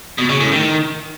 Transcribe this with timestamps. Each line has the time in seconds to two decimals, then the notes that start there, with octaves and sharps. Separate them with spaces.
0.18 B2
0.29 C#3
0.40 A2
0.52 D#3